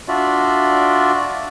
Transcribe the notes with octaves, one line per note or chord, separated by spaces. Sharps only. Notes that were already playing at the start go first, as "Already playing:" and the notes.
D4 F4 F#4 D5 E5